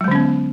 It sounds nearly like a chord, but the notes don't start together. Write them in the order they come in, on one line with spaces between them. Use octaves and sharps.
F#3 G#3 D3 C#4 B3